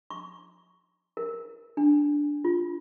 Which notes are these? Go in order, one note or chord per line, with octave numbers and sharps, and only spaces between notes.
C#6
A#4
D4
F4